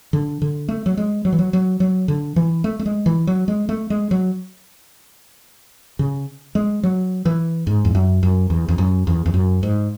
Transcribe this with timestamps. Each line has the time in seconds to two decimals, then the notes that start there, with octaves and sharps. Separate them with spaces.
0.13 D3
0.42 D3
0.68 A3
0.86 F#3
0.97 G#3
1.25 F#3
1.33 E3
1.39 F#3
1.53 F#3
1.80 F#3
2.08 D3
2.36 E3
2.64 A3
2.79 A3
2.86 G#3
3.06 E3
3.27 F#3
3.48 G#3
3.69 A3
3.90 G#3
4.11 F#3
5.99 C#3
6.55 G#3
6.83 F#3
7.26 E3
7.67 G#2
7.85 E2
7.95 F#2
8.23 F#2
8.50 E2
8.69 E2
8.78 F#2
9.07 E2
9.26 E2
9.34 F#2
9.63 G#2